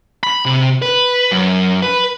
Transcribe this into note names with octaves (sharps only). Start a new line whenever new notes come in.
B5
C3
B4
F#2
B4